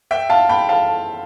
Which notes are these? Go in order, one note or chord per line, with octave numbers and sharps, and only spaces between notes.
E5 G5
F5 A5
G5 B5
F5 A5